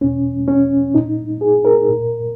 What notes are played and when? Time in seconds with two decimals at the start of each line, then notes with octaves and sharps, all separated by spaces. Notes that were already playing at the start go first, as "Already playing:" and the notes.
0.01 E2 B2 C#4
0.48 C#4
0.94 A#2 D#4
1.41 G#4
1.65 A#4
1.88 A#2